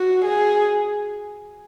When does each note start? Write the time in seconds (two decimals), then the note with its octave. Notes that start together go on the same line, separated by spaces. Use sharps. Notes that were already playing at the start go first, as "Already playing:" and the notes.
Already playing: F#4
0.25 G#4